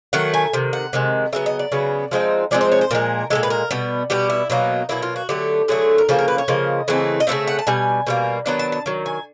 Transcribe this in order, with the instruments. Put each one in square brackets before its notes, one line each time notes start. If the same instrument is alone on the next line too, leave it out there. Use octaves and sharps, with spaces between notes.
[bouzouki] D#3 F#3 A3 F#5
G#5
C3 D#3
F#5
C3 D#3 G#3
C#3 F#3 B3 E5
D#5
D5
C#3 F#3 B3
F3 G#3 C4 D#4
F3 G#3 C4 D#4 D5
C5
C#5
C5
A#2 F3 G#3 A#4
F3 G#3 A4
A#2
B4
A#4
B2 G3 B3
B2 G3 B3 G4
E4
B2 F#3 A#3 D#4
B2 F#3 A#3 E4
F4
F#4
D3 F#3 A3 G4
D3 F#3 A3 G#4
A#4
C#3 F3 A#3 A4
A#4
B4
C#5
C#3 F3 A#3 D#5
C#3 E3 A3 C4
D#5
C#3 E3 A3 C4 E5
F#5
A5
B2 G3 G#5
B2 G3 A#3
D#3 F#3 B3 D4 A#5
A5
A5
D#3 F#3
G#5